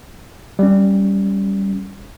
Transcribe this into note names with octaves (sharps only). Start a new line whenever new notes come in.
G3 C#4